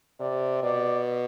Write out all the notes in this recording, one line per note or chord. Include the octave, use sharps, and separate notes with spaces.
C3 D5
B2 D5